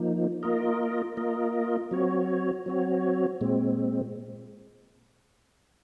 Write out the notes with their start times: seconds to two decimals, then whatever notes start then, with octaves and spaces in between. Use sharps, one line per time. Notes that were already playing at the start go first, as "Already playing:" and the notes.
Already playing: F3 A#3 D#4
0.43 A#3 F4 A#4 D#5
1.17 A#3 F4 A#4 D#5
1.91 F#3 C4 F#4 C#5
2.66 F#3 C4 F#4 C#5
3.41 A#2 G#3 C4